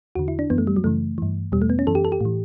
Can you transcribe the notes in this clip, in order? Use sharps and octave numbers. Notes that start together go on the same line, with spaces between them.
E2 D3 F#4
E4
D4
F#2 E3 B3
A3
G3
F#3
F#2 C#3 E3 A3
G2 E3
E2 B2 G3
A3
B3
C#4
F#2 E3 A4
G4
A4
G4
A2 E3